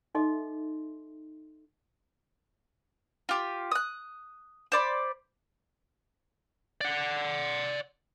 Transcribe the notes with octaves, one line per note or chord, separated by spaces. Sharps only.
D#4 A4 D#5 E5 C6 D6
F4 G4
D#6 F#6
C5 D5 B5
D5 F#5